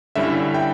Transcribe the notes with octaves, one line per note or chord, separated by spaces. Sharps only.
G2 D3 G3 C#4 E4 E5
G5